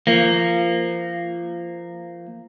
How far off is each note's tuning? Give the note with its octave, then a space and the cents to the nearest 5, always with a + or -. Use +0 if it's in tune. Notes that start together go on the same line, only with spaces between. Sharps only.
F3 -25 A#3 -15